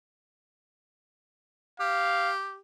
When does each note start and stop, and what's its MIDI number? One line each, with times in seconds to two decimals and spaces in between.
1.80 2.57 67
1.80 2.32 77